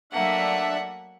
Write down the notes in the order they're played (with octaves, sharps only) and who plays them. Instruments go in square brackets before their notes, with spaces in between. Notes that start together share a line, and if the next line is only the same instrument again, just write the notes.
[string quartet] F#3 A3 A#3 [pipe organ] D4 E5 [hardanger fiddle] F#5